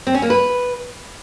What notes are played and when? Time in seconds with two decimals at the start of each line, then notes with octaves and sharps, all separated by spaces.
0.07 C4
0.14 C#4
0.22 A#3
0.30 B4